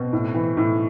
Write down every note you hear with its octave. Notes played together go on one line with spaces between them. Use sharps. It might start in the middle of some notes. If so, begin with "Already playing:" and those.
Already playing: B2 C4
A2
E3
A2